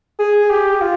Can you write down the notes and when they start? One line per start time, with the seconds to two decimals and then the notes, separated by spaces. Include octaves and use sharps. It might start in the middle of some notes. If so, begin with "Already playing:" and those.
0.19 G#4
0.50 G4
0.81 F4